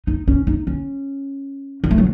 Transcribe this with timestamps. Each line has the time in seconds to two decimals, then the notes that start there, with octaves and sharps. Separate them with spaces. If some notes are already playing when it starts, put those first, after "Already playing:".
0.07 D#4
0.28 C#4
0.47 D#4
0.67 C#4
1.84 A#3
1.91 A3
1.98 F#3